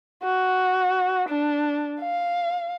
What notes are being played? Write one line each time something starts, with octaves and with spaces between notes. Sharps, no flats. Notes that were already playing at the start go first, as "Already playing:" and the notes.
F#4
D4
F5